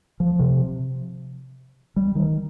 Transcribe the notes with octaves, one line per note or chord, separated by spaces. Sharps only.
F3
C3
G3
D#3